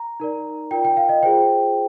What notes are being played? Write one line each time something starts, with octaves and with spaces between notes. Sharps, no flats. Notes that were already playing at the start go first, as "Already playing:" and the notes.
Already playing: A#5
D#4 A#4 D5
F4 A#4 D5 G5
G5
F5
D#5
F4 G#4 C5 G5